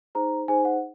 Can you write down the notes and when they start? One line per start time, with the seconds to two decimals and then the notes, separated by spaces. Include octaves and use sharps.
0.15 D#4 G#4 C5 A#5
0.48 D#4 G#4 C5 G#5
0.65 F#5